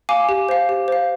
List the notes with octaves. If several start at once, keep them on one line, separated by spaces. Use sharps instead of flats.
F5 G#5 D6
G4
C5 F5
G4
C5 F5